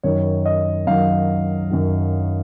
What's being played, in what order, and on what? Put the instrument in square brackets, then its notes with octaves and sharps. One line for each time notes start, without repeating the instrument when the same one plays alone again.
[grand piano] F#2 D#3 F#3 C#5
D#5
F#2 D#3 F#3 F5
F#2 D#3 F#3